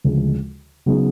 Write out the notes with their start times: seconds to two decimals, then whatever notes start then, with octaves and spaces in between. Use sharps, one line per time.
0.04 D2 C#3 F3 G#3
0.86 C#3 F#3 B3 D#4 G#4